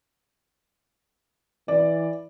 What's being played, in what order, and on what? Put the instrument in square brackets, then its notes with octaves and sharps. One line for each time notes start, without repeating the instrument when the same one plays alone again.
[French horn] E3 [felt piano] D5